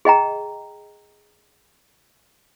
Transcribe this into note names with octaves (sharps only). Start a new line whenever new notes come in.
G#4 D#5 G5 A#5